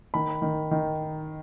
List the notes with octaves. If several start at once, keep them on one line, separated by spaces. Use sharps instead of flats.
D#3 B5
D#3
D#3